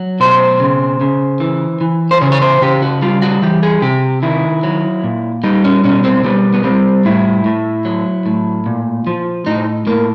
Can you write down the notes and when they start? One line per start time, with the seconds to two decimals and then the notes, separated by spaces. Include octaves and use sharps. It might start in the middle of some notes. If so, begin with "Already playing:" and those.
Already playing: F#3
0.20 B2 C5
0.60 C#3
1.01 C#3
1.40 E3
1.81 E3
2.11 C5
2.22 C#3 C#5
2.32 C#5
2.42 C5
2.61 C#3 G4
2.82 F#4
3.02 G3 F4
3.22 F#4
3.42 E3 G4
3.63 G#4
3.82 C3 G4
4.22 D#3 E4
4.63 F#3
5.04 A#2
5.44 G3 D#4
5.65 C#4
5.84 B2 C#4
6.04 C4
6.25 G3 B3
6.54 B3
6.64 G3 C4
7.05 A2 E4
7.45 A2
7.85 F#3
8.26 A2
8.66 A#2
9.07 F3
9.47 A2 D#4
9.87 A2 A#3